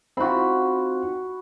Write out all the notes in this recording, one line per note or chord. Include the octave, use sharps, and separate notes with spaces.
C4 D#4 F4 F#4 B5